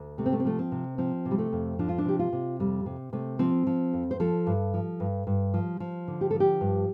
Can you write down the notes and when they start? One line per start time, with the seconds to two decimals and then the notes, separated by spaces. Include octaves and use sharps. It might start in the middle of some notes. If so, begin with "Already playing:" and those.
Already playing: D2
0.18 C3 A3
0.26 C4
0.33 A3
0.40 C4
0.45 F3 A3
0.59 C4
0.72 C3
0.98 F3 C4
1.25 C3
1.31 G3
1.38 A3
1.53 F2
1.79 F3 D4
1.89 F4
1.98 D4
2.05 C3 G4
2.19 F4
2.33 C3
2.59 F2 G3
2.86 C3
3.13 C3 A3
3.39 F3 C4
3.67 F3
3.93 F2
4.11 C5
4.20 F3 A4
4.47 G2
4.74 F3
5.00 G2
5.27 G2
5.54 F3
5.80 F3
6.08 D3
6.21 G4
6.31 F3 A4
6.40 G4
6.61 G2